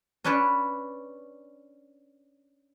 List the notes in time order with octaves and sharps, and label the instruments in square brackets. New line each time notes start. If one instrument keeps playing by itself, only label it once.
[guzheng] C#4 D4 B4 C#5 D5